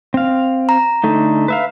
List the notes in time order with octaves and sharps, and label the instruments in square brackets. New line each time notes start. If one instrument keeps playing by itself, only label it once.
[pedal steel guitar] C4 F5
[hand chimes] A#5
[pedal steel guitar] D3 A3 D#4
B4 E5 F5